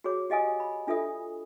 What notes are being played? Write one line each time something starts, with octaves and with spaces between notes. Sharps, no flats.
F#4 G#4 C#5 D6
G4 D#5 F5 G#5 D#6
B5
D4 F4 A4 E5 D#6